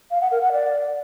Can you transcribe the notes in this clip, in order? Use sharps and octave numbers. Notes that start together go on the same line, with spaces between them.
F5
F#5
A#4
F#5
D5